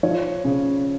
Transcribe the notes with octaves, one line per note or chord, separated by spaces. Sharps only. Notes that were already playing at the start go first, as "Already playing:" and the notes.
F3 C#5
C#3